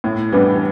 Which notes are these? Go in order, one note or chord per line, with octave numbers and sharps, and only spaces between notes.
A2
E3 G3 B3 D4